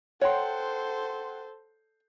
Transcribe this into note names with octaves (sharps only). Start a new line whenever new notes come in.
A4 C5 C#5 F#5 G5 C6